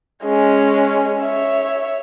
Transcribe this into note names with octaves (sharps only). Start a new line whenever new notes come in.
G#3 C#4
C#5 E5